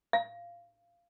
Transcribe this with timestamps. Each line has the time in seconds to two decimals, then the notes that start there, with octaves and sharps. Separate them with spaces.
0.13 F5